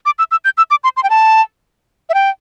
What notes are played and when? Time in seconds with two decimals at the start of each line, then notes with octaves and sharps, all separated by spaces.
0.06 D6
0.19 E6
0.31 E6
0.45 G6
0.58 E6
0.71 D6
0.84 C6
0.97 C6
1.03 G5
1.10 A5
2.09 E5
2.14 G5